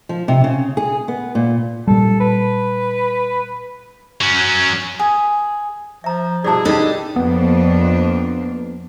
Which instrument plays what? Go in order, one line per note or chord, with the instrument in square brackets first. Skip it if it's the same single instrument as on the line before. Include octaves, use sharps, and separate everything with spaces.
[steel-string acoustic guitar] F3
C3
C#3
G#4
B3
A#2
[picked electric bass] A#2 G3 [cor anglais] A4
[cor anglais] B4
[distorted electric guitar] F#3 C#4
[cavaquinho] G#4
[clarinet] F3 [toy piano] E5 A#5
[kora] G2 B2 E4 [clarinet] G#4 [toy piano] D5 A5
[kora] D4 G4 [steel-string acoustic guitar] D#4 A4 B4 [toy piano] D#5
[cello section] F2 A#3 D4 [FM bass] B3